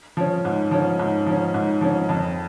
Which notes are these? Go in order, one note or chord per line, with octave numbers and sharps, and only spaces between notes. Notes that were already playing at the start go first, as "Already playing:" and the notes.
F3 C#4
G#2
F3 C#4
G#2
F3 C#4
G#2
F3 C#4
F2